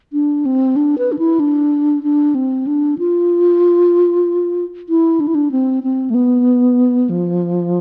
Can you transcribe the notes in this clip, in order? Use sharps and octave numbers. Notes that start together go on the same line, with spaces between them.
D4
C4
D4
B4
D4
E4
D4
D4
C4
D4
F4
E4
D4
E4
D4
C4
C4
A3
B3
F3